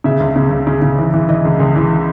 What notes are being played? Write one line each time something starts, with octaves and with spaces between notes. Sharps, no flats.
C#3 E5
C#2
C#3
C#2
C#3
C#3
E3
E3
E3 D#5
C#2
C#2 G#4
E3